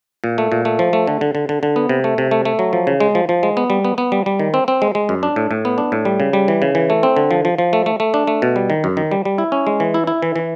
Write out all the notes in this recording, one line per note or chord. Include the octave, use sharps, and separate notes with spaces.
A#2
A3
A#2
A3
F3
A3
D3
D3
D3
D3
D3
B3
C3
A3
C3
A3
A3
F#3
F3
C#3
G#3
F3
F3
G#3
B3
G3
B3
B3
G3
G3
D#3
C4
C4
G#3
G#3
F#2
D4
A2
A2
B3
D4
A2
G3
C#3
G3
E3
C#3
E3
A3
C4
D3
F3
F3
F3
A3
A3
A3
D4
A3
B2
G3
D#3
F#2
D#3
G3
G3
E4
C#4
G#3
E3
E4
E4
E3
E3